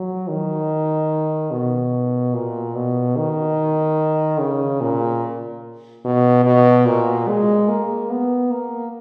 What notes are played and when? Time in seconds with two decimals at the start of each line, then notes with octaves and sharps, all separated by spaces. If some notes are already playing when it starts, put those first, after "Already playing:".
Already playing: F#3
0.28 D#3
1.51 B2
2.34 A#2
2.75 B2
3.16 D#3
4.40 C#3
4.81 A#2
6.05 B2
6.45 B2
6.86 A#2
7.28 G#3
7.69 A#3
8.10 B3
8.51 A#3